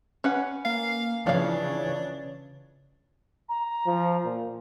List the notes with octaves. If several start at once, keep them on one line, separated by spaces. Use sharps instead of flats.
C#4 B4 F#5
A#3 F5
C#3 E3 F3 D4 C#5 F5
A#5
F3
A#2